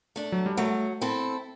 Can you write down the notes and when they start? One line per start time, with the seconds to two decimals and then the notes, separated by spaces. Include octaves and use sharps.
0.16 A3 D4
0.32 F#3
0.46 G3
0.57 F#3 A3
1.01 C4 E4 A4